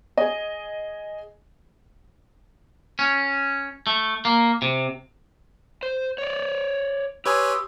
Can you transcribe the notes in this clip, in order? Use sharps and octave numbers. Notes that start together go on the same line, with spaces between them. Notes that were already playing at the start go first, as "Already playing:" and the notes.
G#4 D#5
C#4
A3
A#3
C3
C5
C#5 D5
G4 B4 C#5 G#5 C6 D#6 E6